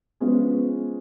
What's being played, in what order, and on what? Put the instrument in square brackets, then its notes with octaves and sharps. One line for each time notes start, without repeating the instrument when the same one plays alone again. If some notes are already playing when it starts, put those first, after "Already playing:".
[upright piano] F3 G#3 C#4 G#4 [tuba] B3